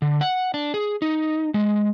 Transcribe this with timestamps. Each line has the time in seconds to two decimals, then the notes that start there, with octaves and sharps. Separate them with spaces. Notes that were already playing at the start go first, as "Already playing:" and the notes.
0.02 D3
0.21 F#5
0.54 D4
0.74 G#4
1.02 D#4
1.54 G#3